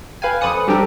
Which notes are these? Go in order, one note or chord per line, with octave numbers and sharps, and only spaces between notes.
B4 F5 G5 G#5
F2 B4 C5 D5 D#6 C#7
G3 C4 D4 G4 A4 A#4